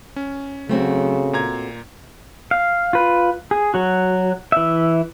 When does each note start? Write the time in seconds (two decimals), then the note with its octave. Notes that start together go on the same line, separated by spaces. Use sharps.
0.16 C#4
0.69 C#3 F#3 A3 C4 F#4
1.33 A#2 A#5 G#6
2.51 F5
2.93 F4 B4
3.51 G#4
3.74 F#3 F#4
4.52 E3 E5